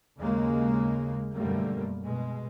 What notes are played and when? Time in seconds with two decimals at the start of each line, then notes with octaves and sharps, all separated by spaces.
0.20 D#2 C#3 G#3 A#3
1.34 F#2 B2 D3 G3 A3 A#3
2.05 B2 G#3